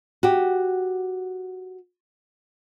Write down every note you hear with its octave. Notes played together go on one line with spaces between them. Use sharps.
F#4 G4